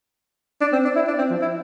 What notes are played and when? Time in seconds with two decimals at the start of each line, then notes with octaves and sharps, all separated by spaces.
0.61 D4
0.73 C4
0.85 D4
0.96 E4
1.08 D4
1.18 C4
1.30 F3
1.42 E4